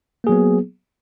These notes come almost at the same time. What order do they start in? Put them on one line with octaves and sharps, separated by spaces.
A#3 G#4 F#3 B3